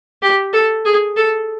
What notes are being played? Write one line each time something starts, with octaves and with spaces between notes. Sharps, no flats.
G4
A4
G#4
A4